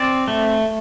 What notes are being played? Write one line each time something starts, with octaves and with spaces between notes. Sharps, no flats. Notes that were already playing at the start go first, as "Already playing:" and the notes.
Already playing: C4 D5
A3